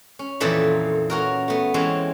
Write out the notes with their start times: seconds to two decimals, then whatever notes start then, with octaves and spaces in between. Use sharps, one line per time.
0.19 C#4
0.40 F2 A#2 D#3 E3 A4 B5
1.10 C#4 F#4 A#4
1.48 A3 B3
1.74 E3 G#3 C4 C#4